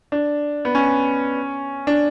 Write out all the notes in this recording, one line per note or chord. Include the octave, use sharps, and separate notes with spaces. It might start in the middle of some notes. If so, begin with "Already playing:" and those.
D4
B3
C#4
D4